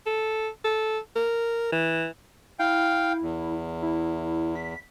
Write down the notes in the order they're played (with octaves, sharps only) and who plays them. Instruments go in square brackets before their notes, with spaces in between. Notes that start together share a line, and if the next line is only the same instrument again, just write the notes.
[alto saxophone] A4
A4
A#4
E3
[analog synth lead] E4 [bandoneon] F5 G5
[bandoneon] E2
[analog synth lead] E4
B6